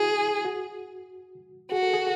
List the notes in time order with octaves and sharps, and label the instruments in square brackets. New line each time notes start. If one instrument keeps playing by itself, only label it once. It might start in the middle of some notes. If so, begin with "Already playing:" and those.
Already playing: [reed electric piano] E4 F#4 [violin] G#4
[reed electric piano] F#4
[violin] F#4 [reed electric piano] G#4
[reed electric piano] A4
G#4